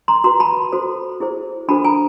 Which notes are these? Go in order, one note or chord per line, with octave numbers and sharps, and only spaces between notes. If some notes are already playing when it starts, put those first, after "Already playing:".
A#5 C6
F#4 B4 A#5 C6
A5 B5
F#4 A4 C5
E4 G#4 C5
D4 F#4 A4 C5 A5 B5
G#5 A#5